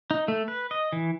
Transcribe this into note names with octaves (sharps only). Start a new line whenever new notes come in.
D#4
A3
B4
D#5
E3